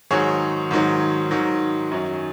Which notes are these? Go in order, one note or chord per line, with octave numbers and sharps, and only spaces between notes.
G#2 D#3 F#3 G#4 C#5
G#2 D#3 F#3
G#2 D#3 F#3
F#2 D#3 F#3